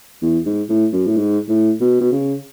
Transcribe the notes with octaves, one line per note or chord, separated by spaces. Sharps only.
E2
G#2
A2
F#2
A2
G#2
A2
B2
B2
C#3